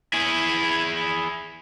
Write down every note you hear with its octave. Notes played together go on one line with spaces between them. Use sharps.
E4 G#4